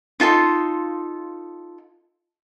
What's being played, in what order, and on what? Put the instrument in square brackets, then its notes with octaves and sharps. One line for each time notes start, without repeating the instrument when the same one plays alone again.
[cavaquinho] D#4 F4 A4 C6